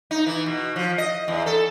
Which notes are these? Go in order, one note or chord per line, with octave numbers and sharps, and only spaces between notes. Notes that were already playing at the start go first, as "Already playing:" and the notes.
D#4
E3
B2
F3
D#5
E2
A4